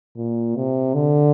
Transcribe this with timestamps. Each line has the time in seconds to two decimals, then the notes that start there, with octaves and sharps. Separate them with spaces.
0.16 A#2
0.55 C3
0.94 D3